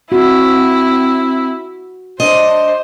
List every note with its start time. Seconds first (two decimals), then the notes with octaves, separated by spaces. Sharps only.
0.12 C4 E4 F#4
2.20 D4 C5 D#5